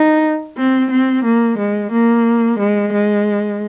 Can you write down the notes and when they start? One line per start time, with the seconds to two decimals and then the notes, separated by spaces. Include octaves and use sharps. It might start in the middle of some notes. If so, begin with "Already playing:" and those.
Already playing: D#4
0.58 C4
0.91 C4
1.24 A#3
1.58 G#3
1.92 A#3
2.59 G#3
2.93 G#3